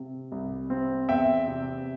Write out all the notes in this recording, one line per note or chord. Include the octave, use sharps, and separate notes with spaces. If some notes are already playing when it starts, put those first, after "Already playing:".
Already playing: C3
C2
C4
E2 E5 G5
C3